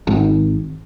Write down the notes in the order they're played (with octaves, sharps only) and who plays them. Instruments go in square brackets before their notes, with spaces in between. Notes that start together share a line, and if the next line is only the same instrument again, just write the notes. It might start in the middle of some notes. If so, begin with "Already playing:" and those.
[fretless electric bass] G#1